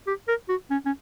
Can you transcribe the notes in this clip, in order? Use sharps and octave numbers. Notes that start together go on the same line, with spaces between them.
G4
A#4
F#4
C#4
C#4